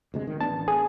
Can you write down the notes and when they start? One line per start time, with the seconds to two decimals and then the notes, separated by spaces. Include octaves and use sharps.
0.14 D2 C3 G#3
0.27 D#3
0.41 A1 B3 D4 A5
0.68 G#4